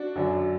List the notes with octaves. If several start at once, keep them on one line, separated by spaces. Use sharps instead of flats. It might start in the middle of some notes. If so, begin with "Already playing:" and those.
Already playing: D4 F#4
F#2 D3 F#3